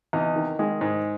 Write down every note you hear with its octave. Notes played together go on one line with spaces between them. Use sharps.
E2 D#4
D#3
D#3 G#3
G#2